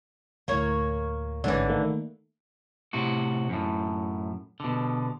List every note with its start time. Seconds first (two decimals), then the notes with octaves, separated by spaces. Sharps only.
0.48 D2 A2 A#3 C#5
1.44 A1 G#2 D3 E3 C#4
1.68 D#3 A3 A#3
2.93 A2 C3 F#4
3.49 F#2 A2
4.60 B2 D3